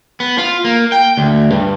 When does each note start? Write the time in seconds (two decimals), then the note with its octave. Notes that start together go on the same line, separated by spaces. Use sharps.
0.20 B3
0.38 F4
0.64 A#3
0.92 G5
1.17 D2
1.52 G2